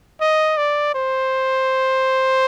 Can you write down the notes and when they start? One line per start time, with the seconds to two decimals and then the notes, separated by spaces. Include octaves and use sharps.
0.21 D#5
0.57 D5
0.95 C5